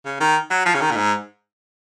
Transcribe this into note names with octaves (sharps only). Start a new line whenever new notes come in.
C#3
D#3
F#3
F3
C#3
D#3
A#2
G#2